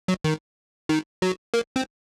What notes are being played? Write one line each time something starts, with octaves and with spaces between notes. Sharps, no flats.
F#3
D#3
D#3
F#3
A#3
C4